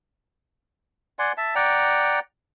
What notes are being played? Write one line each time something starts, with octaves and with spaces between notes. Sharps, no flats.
D5 F#5 G#5 C6
E5 A5
D5 F#5 G5 A#5